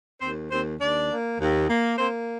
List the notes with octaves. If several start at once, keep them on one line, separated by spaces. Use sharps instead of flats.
D#2 C4 C5
D#2 C4 C5
D#2 D4 D5
A#3
D#2
A#3
A#3 C4 C5